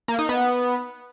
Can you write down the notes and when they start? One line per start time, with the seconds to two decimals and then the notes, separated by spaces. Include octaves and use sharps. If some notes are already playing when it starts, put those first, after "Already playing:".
0.08 A#3
0.19 D#4
0.29 B3